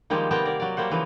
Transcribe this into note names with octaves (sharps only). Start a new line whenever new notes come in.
D#3 F3 G3 G#3 A#3
C3 A#3 B3 G5 A5 A#5
A#4 D5
F#3 D5
G3 A#3 C5 F#5
C#3 E3 F3